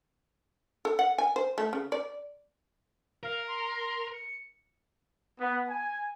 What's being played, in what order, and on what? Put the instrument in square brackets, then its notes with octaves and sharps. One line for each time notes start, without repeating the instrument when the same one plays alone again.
[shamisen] A4
F#5
G#5
C5
A3
C#3
D5
[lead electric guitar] A#4 [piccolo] F5
[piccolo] C6
C#7
[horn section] B3
G#5